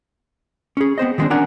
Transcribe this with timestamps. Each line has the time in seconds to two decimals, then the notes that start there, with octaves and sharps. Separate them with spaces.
0.77 C#4 G#4
0.98 B3 C4 C5 D#5
1.18 D#3 E3 G#3 A3 C4 D4
1.30 C#4 D4 A#4 F#5 G#5